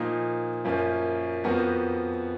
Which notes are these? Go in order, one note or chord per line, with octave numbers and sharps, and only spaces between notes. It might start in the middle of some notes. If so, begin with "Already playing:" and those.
Already playing: A#2 F3 A#3 D#4
F#2 F3 A#3 C#4
F2 F3 B3 F#4 A#4